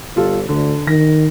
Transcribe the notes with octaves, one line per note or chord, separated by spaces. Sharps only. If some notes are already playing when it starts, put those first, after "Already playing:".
G1 G3 F4 A4
D2 D3
D#3 A#6